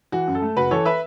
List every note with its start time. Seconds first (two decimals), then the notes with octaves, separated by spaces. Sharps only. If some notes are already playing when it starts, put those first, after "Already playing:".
0.12 E3 F#4
0.27 F#2
0.35 A4
0.42 A3
0.57 F#1 F#4 B4
0.71 E3 A4 C#5
0.85 B4 E5